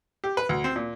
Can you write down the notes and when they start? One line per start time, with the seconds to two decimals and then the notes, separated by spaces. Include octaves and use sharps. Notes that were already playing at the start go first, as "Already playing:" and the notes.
0.24 G4
0.37 B4
0.49 D2
0.64 C4
0.76 A#2